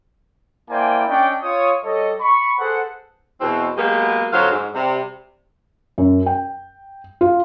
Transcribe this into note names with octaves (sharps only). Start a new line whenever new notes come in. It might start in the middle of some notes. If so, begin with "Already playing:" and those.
A#3 E4 C5 D5 G5 G#5
C#4 D4 C#5 D#5 G5
F4 C#5 D#6
G3 A4 C#5 D#5
B5 C#6
G#4 A4 B4 C5 F#5
E2 B2 C4
F#3 G#3 A#3 B3 G4 G#4
F2 D3 F#3 C5 C#5 F5
G#2
C3 G3
F#2
G5
F4